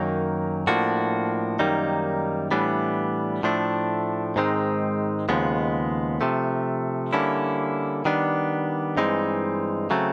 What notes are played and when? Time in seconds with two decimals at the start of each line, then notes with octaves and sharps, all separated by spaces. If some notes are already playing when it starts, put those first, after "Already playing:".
Already playing: F#2 D#3 F#3 A#3 D#4
0.67 A2 F3 A#3 D4 F#4
1.59 F#2 D#3 G3 A#3 D#4
2.51 A2 E3 G3 B3 D4
3.43 A2 F3 A3 D4
4.36 G#2 D#3 G#3 C4 D#4
5.29 D#2 C#3 F3 G#3 B3
6.21 C3 F3 A3
7.13 D3 G3 A#3 C#4 E4
8.05 D#3 G3 B3 D4
8.97 G2 E3 G#3 C4 D#4
9.90 C#3 F#3 A3 C4